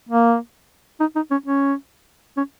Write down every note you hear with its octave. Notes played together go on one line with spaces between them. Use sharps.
A#3
D#4
D#4
C#4
C#4
C#4